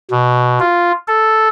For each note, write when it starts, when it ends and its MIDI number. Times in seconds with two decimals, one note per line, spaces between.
0.11 0.59 47
0.60 0.92 65
1.08 1.49 69